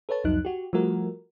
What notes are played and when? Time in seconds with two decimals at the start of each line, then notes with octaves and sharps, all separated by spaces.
0.09 A4 B4 C#5 A5
0.24 C2 F2 F#3 D#4 F#6
0.45 F#4 G4
0.73 F3 G3 A3 F#4 A#4